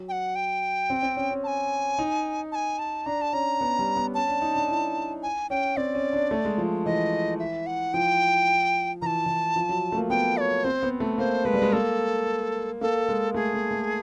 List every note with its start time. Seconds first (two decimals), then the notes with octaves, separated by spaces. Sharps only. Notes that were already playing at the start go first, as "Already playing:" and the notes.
Already playing: F#3
0.09 G5
0.12 F#5
0.35 G5
0.90 C4
1.03 C4
1.17 C#4
1.31 C#4
1.44 A5
1.47 G#5
1.99 D#4
2.52 A5
2.55 G#5
2.79 A5
3.06 D4 A#5
3.22 A5
3.33 C#4 A#5
3.61 B3
3.79 G3
3.96 B3
4.14 C#4 A5
4.28 D4
4.42 D#4
4.56 D4
4.68 E4
5.23 G#5
5.50 C#4 G5
5.77 C4 D5
5.95 C#4
6.13 D4
6.31 A3
6.45 G#3
6.58 F3
6.86 E3 D#5
7.39 E5
7.67 F#5
7.94 F3 G5
9.02 E3 A5 A#5
9.26 E3
9.56 F3
9.69 F#3
9.92 A3
9.97 A#3
10.10 B3 G5
10.37 D5
10.41 C#5
10.64 C4 C5
10.83 B3
11.00 A3
11.18 A#3 C5
11.45 G#3 B4
11.53 G3
11.62 G#3
11.73 A#3 A4
12.81 A#3 A4
13.09 G#3
13.34 A3 G#4
13.54 A#3
13.71 A3